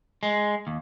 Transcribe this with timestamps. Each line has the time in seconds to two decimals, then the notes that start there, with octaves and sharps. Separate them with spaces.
0.23 G#3
0.67 D#2